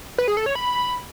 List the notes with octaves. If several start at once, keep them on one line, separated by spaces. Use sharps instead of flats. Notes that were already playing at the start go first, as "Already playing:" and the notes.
B4
G#4
A4
C#5
B5